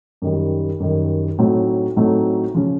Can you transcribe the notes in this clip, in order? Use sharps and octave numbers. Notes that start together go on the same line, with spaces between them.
F#2 D#3 G3
F#2 D#3 G3
A2 F#3 A3 C4 D#4
A2 F#3 A3 C4 D#4
C#3 F3